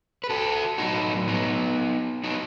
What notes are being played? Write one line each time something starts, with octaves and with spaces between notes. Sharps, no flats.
B4
F#4 A4
A2 F#3 D#4 F#4
B3 D#4
B3 D#4